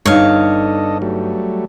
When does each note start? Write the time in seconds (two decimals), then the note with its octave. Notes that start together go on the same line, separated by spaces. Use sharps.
0.06 G1 D4 D#4 A4 C#5 D#5 F5
1.02 F#3 G3 A3